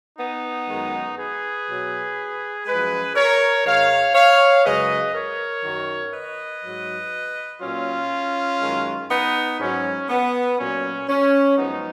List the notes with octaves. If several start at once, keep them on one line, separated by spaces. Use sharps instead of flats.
B3 D#4
F#2 D#3 G#3
G#4 B4
B2 F#3
F#2 F3 G#3 G#4 B4
A#4 C#5
G#2 D#3 G#3 C#5 F5
C#5 F5
F#2 C#3 G#3 B4 D#5
A#4 C#5
F#2 D#3 F#3
B4 D#5
G#2 F#3
A#2 F#3 C#4 F4
F#2 D#3 G#3
B3 D#4
G#2 F#3 C#4
B3
A#2 F#3 C#4
C#4
F#2 F3 G#3 B3 D#4